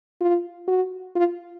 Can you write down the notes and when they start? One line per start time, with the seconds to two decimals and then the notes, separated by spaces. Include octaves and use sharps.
0.21 F4
0.68 F#4
1.16 F4